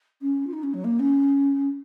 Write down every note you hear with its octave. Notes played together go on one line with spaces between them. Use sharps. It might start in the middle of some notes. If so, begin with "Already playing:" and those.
C#4
F4
D#4
C#4
F#3
A#3
C#4